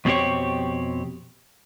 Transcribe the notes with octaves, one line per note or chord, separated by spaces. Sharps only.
F2 B2 C4 C#4 G4 C#5